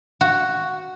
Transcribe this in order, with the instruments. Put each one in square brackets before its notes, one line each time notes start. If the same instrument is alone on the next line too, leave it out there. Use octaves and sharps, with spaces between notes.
[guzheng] F#4